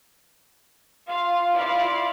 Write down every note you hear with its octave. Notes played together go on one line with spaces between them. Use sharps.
F4 F5
E4 D5 F5